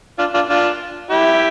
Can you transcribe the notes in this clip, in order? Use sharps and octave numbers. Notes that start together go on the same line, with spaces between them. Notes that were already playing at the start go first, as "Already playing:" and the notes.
D4 F4
D4 F4
D4 F4
E4 G4